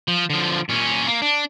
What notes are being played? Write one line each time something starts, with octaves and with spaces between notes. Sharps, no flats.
F3
D3 F3
A#2 C#4
A#3
D4